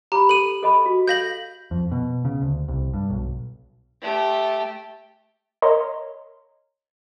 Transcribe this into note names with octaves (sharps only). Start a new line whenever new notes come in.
G4 A#5 B5
A4 D#7 F#7
A4 D#5 B5
F#4
A4 F5 G6 A#6 F#7
F2
B2
C#3
D2
C2
G2
B1
A3 G4
A#4 C#5 D#5 A#5 C6